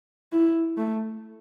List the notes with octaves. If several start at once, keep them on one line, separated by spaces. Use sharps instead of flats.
E4
A3